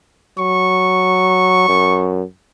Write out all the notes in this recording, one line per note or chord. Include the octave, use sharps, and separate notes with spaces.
F#3 C#6
F#2